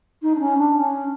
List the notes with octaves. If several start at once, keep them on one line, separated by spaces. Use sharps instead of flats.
D#4
D4
C#4
D4
C#4